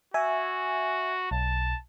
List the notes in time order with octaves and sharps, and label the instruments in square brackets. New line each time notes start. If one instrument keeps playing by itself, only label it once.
[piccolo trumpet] F#4 [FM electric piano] E5 G#5
[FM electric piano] B1 [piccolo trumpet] A5